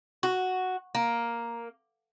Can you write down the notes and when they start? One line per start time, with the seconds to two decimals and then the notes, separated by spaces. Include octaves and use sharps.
0.23 F#4
0.95 A#3